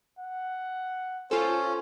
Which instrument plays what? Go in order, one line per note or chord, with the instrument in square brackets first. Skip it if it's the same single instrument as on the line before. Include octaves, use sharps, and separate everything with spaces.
[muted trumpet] F#5
[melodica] C#4 [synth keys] F4 A4 [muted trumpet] C5